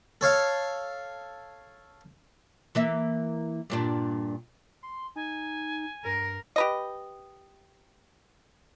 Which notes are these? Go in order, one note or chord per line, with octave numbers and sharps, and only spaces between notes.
A4 C#5 F5
E3 A#3 E5
G2 A#2 D4
C6
D#4 G#5
G2 A#4
G4 B4 D#5